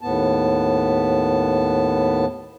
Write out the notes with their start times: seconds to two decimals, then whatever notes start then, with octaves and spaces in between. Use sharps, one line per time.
0.01 D#2 A2 B3 A5